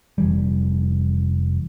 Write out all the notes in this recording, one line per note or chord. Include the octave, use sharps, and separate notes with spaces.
F1 E3 G3